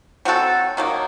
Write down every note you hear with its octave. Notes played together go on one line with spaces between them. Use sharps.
F#3 C4 F#4 A4
D#3 F#3 A#3